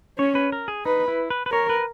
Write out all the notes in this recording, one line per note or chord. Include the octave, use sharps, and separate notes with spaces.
C#4 C#5
B4
A#4
G#4
D#4 B4
E4
B4
B4
A#4 C#5
B4